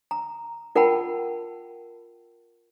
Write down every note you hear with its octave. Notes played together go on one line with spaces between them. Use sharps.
A#5
F4 A#4 F#5 G5 A5 B5